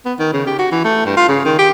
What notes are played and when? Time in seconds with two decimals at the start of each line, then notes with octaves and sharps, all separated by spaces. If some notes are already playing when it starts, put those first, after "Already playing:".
0.05 B3
0.19 D#3
0.33 C#3
0.47 G4
0.59 F#4
0.72 E3
0.84 A3
1.05 G2
1.17 F4
1.29 C#3
1.45 D#3
1.59 G4